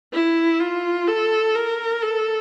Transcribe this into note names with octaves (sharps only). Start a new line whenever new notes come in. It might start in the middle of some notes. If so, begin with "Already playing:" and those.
E4
F4
A4
A#4
A4